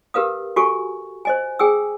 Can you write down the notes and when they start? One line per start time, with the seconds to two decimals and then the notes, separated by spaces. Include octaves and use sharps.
0.14 G4 A#4 B4 F5 D#6
0.56 F#4 G4 A4 G#5 C#6
1.25 C5 D#5 G#5
1.59 G#4 G5 G#5 D#6 E6